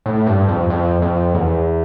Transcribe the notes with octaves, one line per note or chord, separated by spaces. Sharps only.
A2
G2
F2
F2
F2
E2